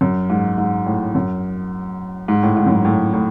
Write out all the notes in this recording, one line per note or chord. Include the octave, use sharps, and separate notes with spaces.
F#2
G#2
G#2
A2
F#2
G#2
A2
G#2
F#2
G#2
A2
A2